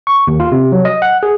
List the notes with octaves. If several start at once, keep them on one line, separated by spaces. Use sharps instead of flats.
C#6
D#2
F4
C3
F#3
D#5
F#5
G#4